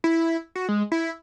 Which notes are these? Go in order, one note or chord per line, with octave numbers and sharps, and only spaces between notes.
E4
F#4
G#3
E4